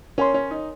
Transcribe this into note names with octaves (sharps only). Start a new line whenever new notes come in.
C#4 A#4 C#5 G#5 C6
C#4
D#4